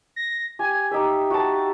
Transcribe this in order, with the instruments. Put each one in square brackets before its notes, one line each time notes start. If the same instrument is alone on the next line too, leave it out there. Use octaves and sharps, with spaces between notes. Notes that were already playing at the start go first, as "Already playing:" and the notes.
[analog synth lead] A#6
[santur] G4 [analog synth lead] G#5
[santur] D#4 E5 [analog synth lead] G4
[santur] F#4 A5